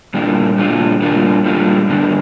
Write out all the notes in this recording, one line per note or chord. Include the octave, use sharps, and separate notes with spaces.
A#2 G3 A#3 D4 F4
A#2 G3 A#3 D4 F4
A#2 G3 A#3 D4 F4
A#2 G3 A#3 D4 F4
G2 D3 A#3 D4